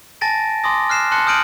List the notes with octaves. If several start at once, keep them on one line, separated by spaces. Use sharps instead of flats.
G#5 A5 A6 A#6 D7
G#5 C6 D6 D#6 A#6
F6 F#6 C7 E7
A5 C6 F#6 C#7
D#6 F6 G6 D7 D#7 F#7